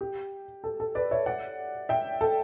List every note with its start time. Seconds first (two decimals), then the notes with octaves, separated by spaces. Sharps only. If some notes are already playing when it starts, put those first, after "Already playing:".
0.01 G4
0.64 A4
0.80 A4
0.95 B4 D5
1.11 C#5 E5
1.26 D5 F#5
1.89 E5 G5
2.21 A4